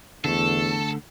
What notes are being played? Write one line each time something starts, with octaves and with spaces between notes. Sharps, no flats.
E2 D3 A3 A4